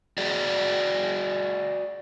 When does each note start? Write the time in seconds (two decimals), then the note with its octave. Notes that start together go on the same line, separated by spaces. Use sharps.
0.18 F#4 G#4 D5